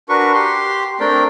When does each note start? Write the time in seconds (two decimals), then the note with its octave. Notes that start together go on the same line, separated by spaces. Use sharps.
0.09 D4 F#4 A#4 B4 C#6
0.34 G4 C6
1.00 A3 C4 D4 A#4 D5 G5